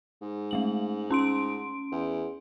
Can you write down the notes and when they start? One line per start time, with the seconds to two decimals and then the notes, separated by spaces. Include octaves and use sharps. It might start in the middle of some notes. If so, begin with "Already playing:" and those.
0.22 G#2
0.51 G#3 A3 F#7
1.10 C#4 C6 D7
1.92 E2